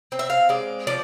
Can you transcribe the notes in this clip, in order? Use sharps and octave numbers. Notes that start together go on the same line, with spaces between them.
C4
E5
F5
G#3 D5
F3 D5